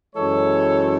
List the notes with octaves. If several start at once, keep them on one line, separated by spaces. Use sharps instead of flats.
F#2 E3 G#3 A4 C#5